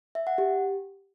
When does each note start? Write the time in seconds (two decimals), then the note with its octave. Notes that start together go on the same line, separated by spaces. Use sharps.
0.15 E5
0.27 F#5
0.38 G4